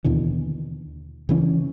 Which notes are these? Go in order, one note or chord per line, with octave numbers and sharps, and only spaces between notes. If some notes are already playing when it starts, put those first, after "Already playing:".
D#2 B2 D3 E3
C#3 E3 C#4